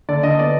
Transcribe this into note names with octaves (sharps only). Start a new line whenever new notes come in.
D3 D5
D3 D#5
B3 D5